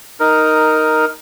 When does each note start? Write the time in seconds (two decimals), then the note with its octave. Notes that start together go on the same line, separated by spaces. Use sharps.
0.20 D#4 A#4